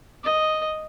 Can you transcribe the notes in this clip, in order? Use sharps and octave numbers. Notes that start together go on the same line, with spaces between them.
D#5